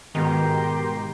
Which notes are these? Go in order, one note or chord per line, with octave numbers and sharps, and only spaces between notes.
G#2 B2 D#3 G#3 G4 A#5 C6